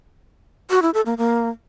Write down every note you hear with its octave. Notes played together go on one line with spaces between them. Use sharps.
F#4
E4
A4
A#3
A#3